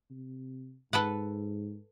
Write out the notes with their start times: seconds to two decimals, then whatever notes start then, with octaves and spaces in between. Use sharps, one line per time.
0.11 C3
0.93 G#2 A4 B4 F#5